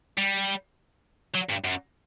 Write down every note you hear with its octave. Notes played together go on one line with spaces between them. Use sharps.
G3
F#3
G2
F#2